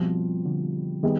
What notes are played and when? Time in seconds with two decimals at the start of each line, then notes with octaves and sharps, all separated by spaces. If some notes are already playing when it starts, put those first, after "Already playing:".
Already playing: B2 F3 G3 C4 F4
0.46 D3
1.03 D#3 G3 B3 D#4 G#4